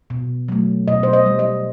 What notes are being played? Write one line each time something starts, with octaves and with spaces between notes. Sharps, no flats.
B2
F#3 A3
B2 D#5
C5
D#5
G3
D#5